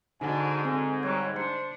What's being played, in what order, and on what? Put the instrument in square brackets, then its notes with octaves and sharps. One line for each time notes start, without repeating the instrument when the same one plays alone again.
[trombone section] G#2 [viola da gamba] D3 F#4 [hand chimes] D#4 [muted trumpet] G#5
[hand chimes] C4 A4 [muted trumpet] G#5
[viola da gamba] G3 [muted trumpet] C#5 [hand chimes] F#6 G#6
[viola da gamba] D4 [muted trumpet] C5 [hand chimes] C#7